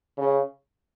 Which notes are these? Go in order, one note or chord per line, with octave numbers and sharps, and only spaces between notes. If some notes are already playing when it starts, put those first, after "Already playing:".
C#3